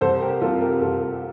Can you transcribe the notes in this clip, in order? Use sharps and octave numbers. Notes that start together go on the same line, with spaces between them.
C2 A4 C5
G4 A#4
C3 G3 C4 F4 A4
G4 A#4
C2 F4 A4